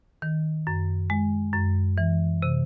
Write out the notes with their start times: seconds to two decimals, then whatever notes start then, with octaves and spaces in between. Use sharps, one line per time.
0.22 D#3
0.67 F#2
1.10 G#3
1.53 F#2
1.98 E3
2.42 C3